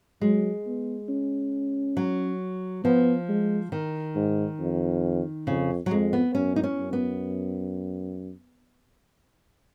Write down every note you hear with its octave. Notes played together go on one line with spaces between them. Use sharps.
F#3 G#3
B3
C#4
F#3
F3 B3
G#3
D#3
G#2
F2
F2 C#3
F#3
F2 G#3
B3
F#2 C#4
D#4
C#4
F#2
B3